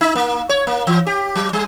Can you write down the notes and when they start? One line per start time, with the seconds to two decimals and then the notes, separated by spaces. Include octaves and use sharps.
0.01 D#4
0.15 A#3
0.49 C#5
0.67 A#3
0.87 E3
1.07 G4
1.36 F#3
1.53 G3